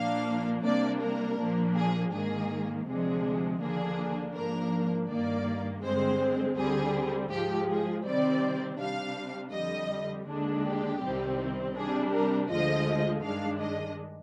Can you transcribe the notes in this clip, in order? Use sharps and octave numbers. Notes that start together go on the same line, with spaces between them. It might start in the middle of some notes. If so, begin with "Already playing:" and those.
Already playing: A#2 F3 A#3 D4 F5
C3 G3 A#3 D4 D5
A#4
A#2 F3 A#3 D4
G#4
G#2 D#3 A#3 G#4
D2 C3 F3 G#3 D4 G#4
D#2 D3 F3 A#3 D4 G#4
G#2 F3 A#3 D4 A#4
G2 D#3 A#3 D5
G2 D3 G#3 C4 C5
D2 D3 G3 C4 G#4
G#2 F3 G#3 G4
G#4
C3 D#3 G3 C4 D5
C3 G3 D4 F5
F2 D3 G3 D#5
D#2 D3 G#3 D4
G4
C2 C3 D#3 G3 C4
C3 G3 D4 G#4
A#4
D2 D3 F3 G#3 D#5
G2 D#3 G#3 D4 F5
D#5